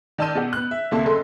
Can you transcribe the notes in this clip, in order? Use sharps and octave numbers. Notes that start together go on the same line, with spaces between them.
D#3 D5 A5 E6 G6 D#7
B2 G4 F#5
B3 F#6
E5
D2 C3 A3 A#3 E5 A5
F#1 A4 C6